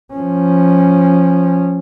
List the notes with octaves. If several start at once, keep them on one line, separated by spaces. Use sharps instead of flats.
F3 C#4